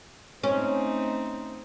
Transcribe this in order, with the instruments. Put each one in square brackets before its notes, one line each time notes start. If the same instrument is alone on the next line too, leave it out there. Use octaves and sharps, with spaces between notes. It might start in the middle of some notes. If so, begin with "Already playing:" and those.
[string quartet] A3 C4 D#4 [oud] C#4